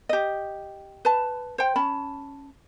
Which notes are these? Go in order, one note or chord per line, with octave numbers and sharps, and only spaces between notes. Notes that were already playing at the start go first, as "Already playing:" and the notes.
G4 D#5
B4 A5
C5 G5
C#4 A5 B5